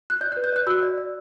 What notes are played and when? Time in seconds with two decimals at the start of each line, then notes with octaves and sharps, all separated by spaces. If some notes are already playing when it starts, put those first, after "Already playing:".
0.10 F#6
0.21 D5 G6
0.32 F#6
0.37 B4
0.44 G6
0.52 D5 F#6
0.67 F#4 E6
0.83 D5
0.98 D5